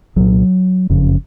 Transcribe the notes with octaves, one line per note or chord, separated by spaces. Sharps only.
C2 A#2 F#3
F#1 F2 C#3